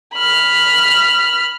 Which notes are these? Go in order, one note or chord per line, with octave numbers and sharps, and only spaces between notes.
B5 F6